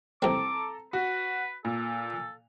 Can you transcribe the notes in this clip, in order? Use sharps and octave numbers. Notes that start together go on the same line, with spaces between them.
C2 C4 A4 A#5 D6
F#4 B4
A#2 A4